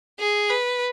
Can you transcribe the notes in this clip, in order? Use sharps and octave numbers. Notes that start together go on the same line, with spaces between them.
G#4
B4